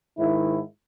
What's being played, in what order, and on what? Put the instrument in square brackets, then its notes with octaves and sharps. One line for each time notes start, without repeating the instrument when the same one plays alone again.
[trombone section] G#2 D#3 E4